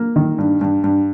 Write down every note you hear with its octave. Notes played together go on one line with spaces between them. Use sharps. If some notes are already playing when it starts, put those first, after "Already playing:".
Already playing: A#3
D#3
G2
G2
G2